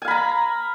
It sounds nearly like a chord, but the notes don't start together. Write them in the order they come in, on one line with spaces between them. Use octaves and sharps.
G#5 F5 B5 A#5